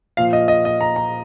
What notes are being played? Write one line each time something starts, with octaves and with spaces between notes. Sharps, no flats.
A#2 F3 F5
D#5
D#5
D#5
A#5
A#5